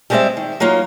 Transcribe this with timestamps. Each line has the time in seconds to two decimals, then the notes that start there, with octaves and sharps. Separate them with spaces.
0.10 G3 G#3 C4 B4 D5 E5
0.37 D#3
0.60 F#3 A#3 D#4 F4